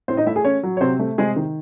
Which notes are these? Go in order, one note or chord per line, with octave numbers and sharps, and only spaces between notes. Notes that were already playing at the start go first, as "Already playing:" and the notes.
A2 C4 C5
D#4 D#5
A3 E4 E5
G#4 G#5
C#4 C#5
F#3
C#5
C3 C4 C5
A3
C3 G#3 G#4
D#3